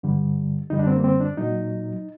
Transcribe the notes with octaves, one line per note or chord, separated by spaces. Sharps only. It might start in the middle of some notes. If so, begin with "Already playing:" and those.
G2 D3 G3
F#2 D3 G3 D#4
D4
C4
A#3
C4
D4
A#2 F#3 D#4